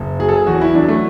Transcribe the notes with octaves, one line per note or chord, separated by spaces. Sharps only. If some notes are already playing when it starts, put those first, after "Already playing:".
Already playing: F#1
F#3 G#4
A4
G#4
E2 F#4
E4
F#3 D4
A3